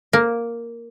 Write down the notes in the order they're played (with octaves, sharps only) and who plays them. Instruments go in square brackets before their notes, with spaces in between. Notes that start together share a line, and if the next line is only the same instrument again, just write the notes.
[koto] A#3